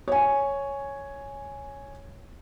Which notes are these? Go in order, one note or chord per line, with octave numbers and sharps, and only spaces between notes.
C#5 G#5